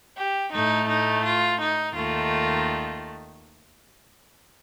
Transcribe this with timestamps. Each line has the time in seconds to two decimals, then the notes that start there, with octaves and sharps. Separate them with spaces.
0.16 G4
0.51 A2 A3 D#4
0.88 D#4
1.24 F4
1.59 D#4
1.94 D#2 D#3 A3 F4